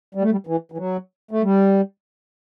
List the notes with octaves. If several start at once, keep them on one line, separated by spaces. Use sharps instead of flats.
G3
A3
G3
E3
E3
F#3
A3
G3